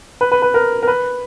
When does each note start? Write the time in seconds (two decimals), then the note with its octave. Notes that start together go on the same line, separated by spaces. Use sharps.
0.21 B4
0.32 B4
0.42 B4
0.54 A#4
0.83 A#4
0.87 B4